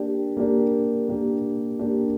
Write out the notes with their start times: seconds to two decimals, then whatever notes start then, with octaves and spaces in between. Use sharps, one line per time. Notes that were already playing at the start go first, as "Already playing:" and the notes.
Already playing: A#3 D4 G4
0.37 A#3 D4 G4
1.08 A#3 D4 G4
1.79 A#3 D4 G4